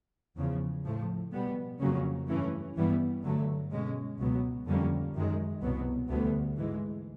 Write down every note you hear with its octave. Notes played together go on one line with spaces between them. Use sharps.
E2 C#3 F3
A2 F3 A3
B2 G3 B3
F2 C#3 F#3 A#3 C#4
G2 E3 A3 C#4
G2 E3 G3 B3
G2 D3 F#3 A3
B2 G#3 C#4
C#2 B2 F#3 B3
F2 D3 G3 A#3 C#4
F#2 D#3 G#3
C2 B2 F#3 B3
D2 D3 G3 B3
G#2 E3 G#3